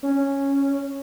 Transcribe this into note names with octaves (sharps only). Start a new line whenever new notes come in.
C#4